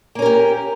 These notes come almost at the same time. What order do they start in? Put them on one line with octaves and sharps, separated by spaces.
A#3 C#4 A#4 G4